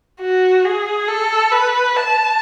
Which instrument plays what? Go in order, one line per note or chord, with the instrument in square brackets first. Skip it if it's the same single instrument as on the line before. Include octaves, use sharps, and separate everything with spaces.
[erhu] F#4
G#4
A4
B4
A5